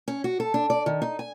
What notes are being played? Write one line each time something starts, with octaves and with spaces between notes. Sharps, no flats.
C#4
F#4
A4
D4
D5
D#3
D#4
G#5